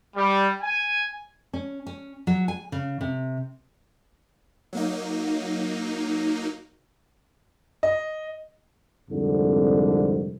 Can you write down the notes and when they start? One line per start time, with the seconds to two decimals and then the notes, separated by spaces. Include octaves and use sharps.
0.16 G3
0.61 G#5
1.53 C#4
1.87 C#4
2.27 F#3
2.48 G#5
2.72 C#3
3.01 C3
4.73 F#3 A#3 D#4
7.83 D#5
9.11 C2 F2 G#2 D3